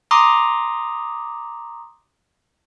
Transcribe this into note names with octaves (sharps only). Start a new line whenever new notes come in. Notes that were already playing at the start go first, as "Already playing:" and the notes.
A#5 C6 D6 D#6